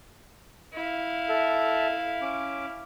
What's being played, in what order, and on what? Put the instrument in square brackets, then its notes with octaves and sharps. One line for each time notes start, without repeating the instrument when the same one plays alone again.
[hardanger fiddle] E4 F5
[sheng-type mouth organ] A4 E5
C#4 D6